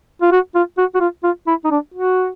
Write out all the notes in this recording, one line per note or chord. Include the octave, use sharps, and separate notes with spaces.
F4
F#4
F4
F#4
F#4
F4
F4
E4
D#4
D4
F#4